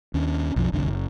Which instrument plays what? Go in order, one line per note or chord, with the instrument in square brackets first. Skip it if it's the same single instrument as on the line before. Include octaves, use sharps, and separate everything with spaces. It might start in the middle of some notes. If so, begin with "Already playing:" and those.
[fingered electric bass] D#2 C#4 D4
B1 F2 F3
G1 C2 F2 D3
F#1